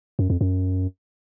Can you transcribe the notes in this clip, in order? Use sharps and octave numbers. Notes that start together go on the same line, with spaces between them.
F#2
F2
F#2